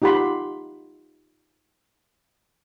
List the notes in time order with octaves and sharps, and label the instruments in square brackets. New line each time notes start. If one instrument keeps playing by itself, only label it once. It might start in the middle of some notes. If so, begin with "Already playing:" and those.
[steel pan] D#4 F4 G4 F#5 B5 C6